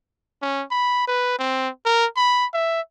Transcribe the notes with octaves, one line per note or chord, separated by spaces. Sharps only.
C#4
B5
B4
C4
A#4
B5
E5